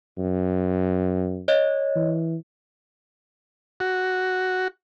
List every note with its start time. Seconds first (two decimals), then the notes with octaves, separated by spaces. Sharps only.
0.18 F#2
1.48 C#5 D#5
1.96 E3
3.80 F#4